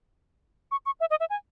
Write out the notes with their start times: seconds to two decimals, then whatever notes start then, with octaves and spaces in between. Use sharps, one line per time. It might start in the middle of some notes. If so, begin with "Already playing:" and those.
0.71 C#6
0.86 C#6
1.00 E5
1.10 D#5
1.20 E5
1.30 G#5